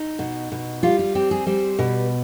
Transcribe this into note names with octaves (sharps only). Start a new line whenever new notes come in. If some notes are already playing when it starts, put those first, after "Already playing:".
Already playing: D#4
B2
B2
G3 F4
F4
C4 G4
G#4
G3 C5
B2 B4